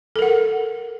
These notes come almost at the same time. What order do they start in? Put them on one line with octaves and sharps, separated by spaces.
A4 A#4 F#5